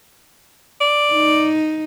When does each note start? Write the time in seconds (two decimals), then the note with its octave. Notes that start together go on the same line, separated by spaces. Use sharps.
0.81 D5
1.13 D#4